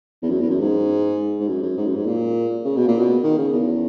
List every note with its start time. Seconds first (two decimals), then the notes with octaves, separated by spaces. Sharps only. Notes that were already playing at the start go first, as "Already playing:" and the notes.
0.22 E2
0.30 F#2
0.40 E2
0.50 F#2
0.60 G#2
1.40 G#2
1.48 F#2
1.62 F#2
1.77 G#2
1.86 F#2
1.95 G#2
2.06 A#2
2.65 C#3
2.76 B2
2.88 A#2
3.00 B2
3.23 D#3
3.38 C#3
3.53 E2